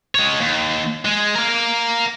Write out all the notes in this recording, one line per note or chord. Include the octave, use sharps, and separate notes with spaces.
G#3 C#5
D#2
G#3
A#4 F5